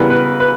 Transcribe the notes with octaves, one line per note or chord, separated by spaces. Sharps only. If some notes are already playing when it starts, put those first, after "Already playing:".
Already playing: C#3 E3 G3 B3 A#4
B4
B4